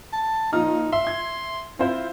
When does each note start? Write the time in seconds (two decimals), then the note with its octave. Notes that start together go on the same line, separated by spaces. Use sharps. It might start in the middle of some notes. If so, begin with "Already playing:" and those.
0.13 A5
0.53 A#2 F3 D#4 F6
0.93 E5 C6
1.05 E5 G#6
1.79 C4 E4 F4 C5